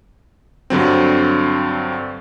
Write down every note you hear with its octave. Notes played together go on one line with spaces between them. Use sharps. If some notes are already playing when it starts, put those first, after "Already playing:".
G2 D3 F#3 C4